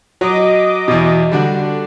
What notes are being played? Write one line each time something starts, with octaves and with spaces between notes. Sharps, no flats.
F#3 D#5 D6
E2 B2
D3 G3 D4 F#4